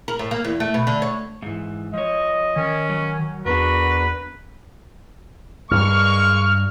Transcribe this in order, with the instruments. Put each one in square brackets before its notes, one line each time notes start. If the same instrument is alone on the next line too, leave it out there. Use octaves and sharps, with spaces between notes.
[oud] A#4
A2
A#3
E2
A3
B2
D3
C#5
[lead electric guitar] G#2 E3
[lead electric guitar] F3 C#5 [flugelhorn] D#5
[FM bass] D#3 [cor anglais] C#4
[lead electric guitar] F#3
[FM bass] E2 [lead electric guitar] D4 A#4 [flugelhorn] F#4 [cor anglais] B4
[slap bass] G2 G3 [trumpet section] G#3 A#3 C#6 [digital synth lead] F6